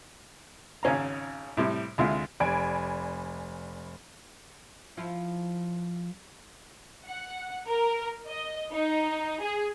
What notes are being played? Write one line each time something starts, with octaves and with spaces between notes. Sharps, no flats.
G#1 C#3 C#4 F5 A#5
A2 C3 G3
D2 C3 G#3 E4 F4
F1 D5 G#5 B5 G#6 D7
F3 E4 F4
F#5
A#4
D#5
D#4
G#4